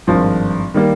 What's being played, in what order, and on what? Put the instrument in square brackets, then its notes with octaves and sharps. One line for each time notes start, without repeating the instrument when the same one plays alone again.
[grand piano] G#1 G2 F3
D#3 G3 A#3